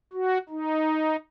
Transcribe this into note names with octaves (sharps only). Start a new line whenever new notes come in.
F#4
D#4